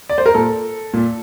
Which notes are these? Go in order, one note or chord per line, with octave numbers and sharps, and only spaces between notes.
D5
C5
A#4
A#2 A4
A#2